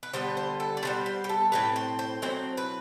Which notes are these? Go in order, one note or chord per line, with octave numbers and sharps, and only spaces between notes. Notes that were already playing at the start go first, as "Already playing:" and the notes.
B4
D3 G3 B3 C5
C5
A4
D5
D3 G3 B3 C5
C5
G4
A4
A2 F#3 C4 B4
C5
C5
A2 F#3 C4 C5
B4